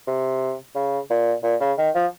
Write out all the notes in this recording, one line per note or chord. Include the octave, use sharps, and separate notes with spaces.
C3
C#3
A#2
A#2
C#3
D#3
F3